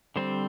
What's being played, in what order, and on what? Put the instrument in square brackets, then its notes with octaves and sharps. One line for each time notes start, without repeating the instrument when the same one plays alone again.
[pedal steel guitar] D3 G3 C4 C5